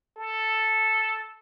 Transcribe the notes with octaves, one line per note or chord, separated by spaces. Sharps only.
A4